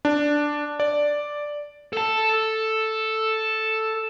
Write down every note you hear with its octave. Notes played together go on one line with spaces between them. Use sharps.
D4
D5
A4 A5